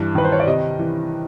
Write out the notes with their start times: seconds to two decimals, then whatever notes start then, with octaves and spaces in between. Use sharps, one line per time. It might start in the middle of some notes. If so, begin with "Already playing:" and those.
Already playing: G2 E3
0.15 D#3 B4
0.25 C5
0.32 C#5
0.40 D5
0.47 C3 D#5
0.79 E3